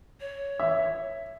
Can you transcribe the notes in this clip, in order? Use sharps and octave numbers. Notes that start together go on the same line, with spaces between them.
C#5
E5